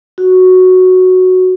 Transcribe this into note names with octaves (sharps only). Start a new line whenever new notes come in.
F#4